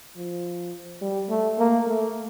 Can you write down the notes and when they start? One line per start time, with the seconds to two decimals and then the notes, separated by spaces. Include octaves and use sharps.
0.17 F3
1.01 G3
1.29 A3
1.59 A#3
1.87 A3